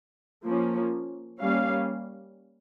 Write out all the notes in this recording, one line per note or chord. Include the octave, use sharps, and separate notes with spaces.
F3 A#3 C#4
G3 A#3 C#4 F5